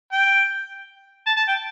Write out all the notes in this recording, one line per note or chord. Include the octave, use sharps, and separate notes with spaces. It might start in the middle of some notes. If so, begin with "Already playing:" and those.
G5
A5
A5
G5